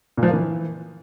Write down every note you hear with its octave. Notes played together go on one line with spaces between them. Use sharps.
A#2
F3
A#3
E3